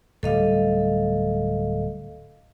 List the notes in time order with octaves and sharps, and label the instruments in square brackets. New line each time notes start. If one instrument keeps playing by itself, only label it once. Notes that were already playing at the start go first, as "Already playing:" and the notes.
[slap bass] D1 G3 [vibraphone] A4 D#5 F5